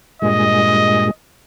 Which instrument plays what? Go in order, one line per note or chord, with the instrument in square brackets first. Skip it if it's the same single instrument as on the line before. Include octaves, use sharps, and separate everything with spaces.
[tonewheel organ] G2 A#2 G#3 [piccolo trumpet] D#5